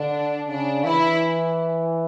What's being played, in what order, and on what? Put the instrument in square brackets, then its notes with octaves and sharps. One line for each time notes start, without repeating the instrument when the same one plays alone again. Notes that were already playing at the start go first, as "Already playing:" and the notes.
Already playing: [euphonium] D3 [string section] D4
[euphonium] C#3 [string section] D4
[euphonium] E3 [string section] E4